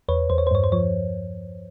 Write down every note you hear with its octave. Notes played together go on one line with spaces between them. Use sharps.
E2 B4 C#5
E2 C5
C#5
C5
G2 C#5
C5
F3 C#5